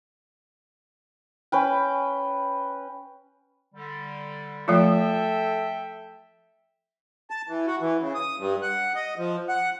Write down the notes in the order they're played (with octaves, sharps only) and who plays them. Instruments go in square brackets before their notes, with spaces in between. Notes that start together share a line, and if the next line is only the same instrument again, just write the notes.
[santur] C#4 B4 G5
[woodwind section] D3 G3
[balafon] F3 A3 F4 [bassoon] A4 [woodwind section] E5 G5
[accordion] A5
E3
F#4
E3
C#3
D#6
G2
F#5
D#5
F3
F#5